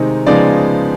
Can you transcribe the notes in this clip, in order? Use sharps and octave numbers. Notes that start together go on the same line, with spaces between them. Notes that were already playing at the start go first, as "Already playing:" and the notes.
Already playing: C3 D#3 G#3 C4 D#4
C#3 F3 G#3 B3 D#4 D5